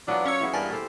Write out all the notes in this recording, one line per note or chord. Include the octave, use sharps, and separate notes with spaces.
E3 F#3 B3 D4 F4 A#4
C#4 C#5 E6
E3 B3 E4 G#4
G2 A#3 G#5 A5 A6
G4 A4 C5